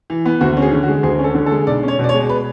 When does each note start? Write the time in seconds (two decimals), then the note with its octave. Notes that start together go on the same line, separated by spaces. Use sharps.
0.10 E3
0.25 B3
0.41 D2 F#4
0.57 C#4
0.62 G#4
0.72 D3
0.83 F#4
0.88 G#3
1.03 D2 G#4
1.19 C#4
1.24 A4
1.35 D3
1.46 A4
1.51 G#3
1.67 B1 D5
1.83 C#4
1.88 C#5
1.99 B2 D5
2.09 C#5
2.14 G#3
2.29 B4